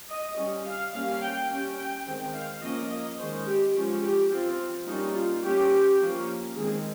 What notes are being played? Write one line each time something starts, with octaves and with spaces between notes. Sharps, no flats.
D#5
G3 C#4
F5
G3 A#3 C#4 F5
G5
G3 C#4
G5
D#3 G#3 C4 G5
F5
F3 A#3 C#4 D#5
D#5
D#3 G#3 C#4 C5
G4
F3 G#3 C#4
G4
F3 C4 F4
G3 A#3 C#4 D#4
F4
G3 A#3 C#4 G4
F3 A#3 C#4
D#3 G#3 C4 G#4